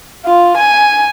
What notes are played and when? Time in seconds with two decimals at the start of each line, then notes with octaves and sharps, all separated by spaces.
0.25 F4
0.56 G#5